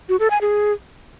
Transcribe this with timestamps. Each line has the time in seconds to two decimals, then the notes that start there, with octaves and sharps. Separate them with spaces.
0.09 F#4
0.20 A4
0.30 G#5
0.41 G#4